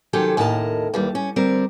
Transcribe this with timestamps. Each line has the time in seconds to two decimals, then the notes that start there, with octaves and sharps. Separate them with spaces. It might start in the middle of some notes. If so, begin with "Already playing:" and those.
0.13 C3 D#3 F#3 C#4 G4 A4
0.37 D#2 A2 C#3 A#4 D#5 A5
0.94 D#2 E3 G3
1.15 C#4
1.36 D2 G3 C4 A#4